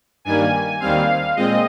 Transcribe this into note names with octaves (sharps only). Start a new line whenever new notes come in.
G2 D#3 G3 A#3 G#5
D#2 D#3 G3 C4 F5
A#2 G#3 C4 D#5